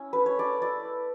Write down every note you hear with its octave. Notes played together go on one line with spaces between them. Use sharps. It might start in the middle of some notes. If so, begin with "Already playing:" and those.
Already playing: C#4 E4
A3 B4
C#5
A3 D5
E4 D5